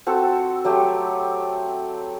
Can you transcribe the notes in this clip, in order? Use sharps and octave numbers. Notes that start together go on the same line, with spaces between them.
C4 F#4 A4
F#3 A3 G4